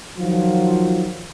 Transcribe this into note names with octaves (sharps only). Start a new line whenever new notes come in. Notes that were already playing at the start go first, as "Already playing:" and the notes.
D#3 F3 F#3 F4